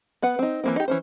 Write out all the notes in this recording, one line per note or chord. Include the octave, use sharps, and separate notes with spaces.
B3 B4 F#5
C4 D#4
E3 A#3 C4
D#4 G4
E3 C#4 C5